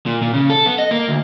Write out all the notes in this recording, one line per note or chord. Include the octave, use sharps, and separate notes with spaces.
A#2
A#2
C#3
A4
B3
D#5
A#3
D2